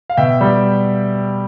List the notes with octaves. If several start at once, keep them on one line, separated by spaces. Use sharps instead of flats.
F5
B2 E5 G5
G3